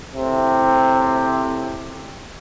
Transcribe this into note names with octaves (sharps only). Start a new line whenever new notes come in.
A2 C3